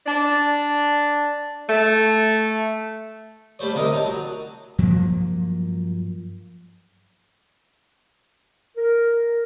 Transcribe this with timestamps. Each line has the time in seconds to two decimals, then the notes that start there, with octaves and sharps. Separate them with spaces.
0.07 D4
1.67 A3
3.59 G3 A3 C5 C#5
3.75 C2 C3 A#4 D#5
3.92 D#4 C#5 A5
4.05 F#3
4.79 G2 F3 F#3 A#3
8.77 A#4